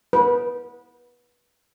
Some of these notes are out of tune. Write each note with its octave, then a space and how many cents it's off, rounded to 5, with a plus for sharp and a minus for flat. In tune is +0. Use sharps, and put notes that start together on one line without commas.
B4 -25